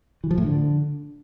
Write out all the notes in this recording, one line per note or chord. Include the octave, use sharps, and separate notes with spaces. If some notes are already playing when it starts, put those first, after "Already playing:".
E3
F3
A2
D3